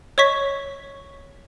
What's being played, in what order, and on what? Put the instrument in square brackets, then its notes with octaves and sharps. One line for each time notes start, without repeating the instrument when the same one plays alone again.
[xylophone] C#5 D#5 C#6 B6